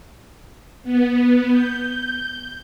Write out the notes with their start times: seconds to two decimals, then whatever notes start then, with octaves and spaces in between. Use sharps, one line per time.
0.83 B3
1.50 G6